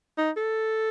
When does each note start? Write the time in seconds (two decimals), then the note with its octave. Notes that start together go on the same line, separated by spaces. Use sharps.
0.18 D#4
0.37 A4